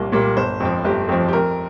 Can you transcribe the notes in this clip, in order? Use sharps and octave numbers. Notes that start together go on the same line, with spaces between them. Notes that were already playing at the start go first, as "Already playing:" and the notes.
Already playing: C2 A#2 G3 A#3
A#2 G3 A#3
G1 C5
F2 F3
G1 G4
F2 F3
G4
F2 A#4